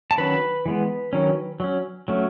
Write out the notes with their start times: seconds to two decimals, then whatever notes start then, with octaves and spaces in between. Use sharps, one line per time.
0.11 A5
0.18 D#3 F#3 C#4 B4 B5
0.66 E3 G#3 B3
1.13 D#3 F#3 C#4
1.60 F#3 C#4
2.08 F#3 A3 C#4